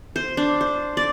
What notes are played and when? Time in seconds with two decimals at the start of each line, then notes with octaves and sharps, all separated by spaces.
0.16 C5
0.37 D4
0.61 C5
0.97 D5